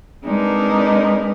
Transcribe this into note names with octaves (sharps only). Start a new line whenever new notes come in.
G#3 C4 D4 D#4 A#4 B4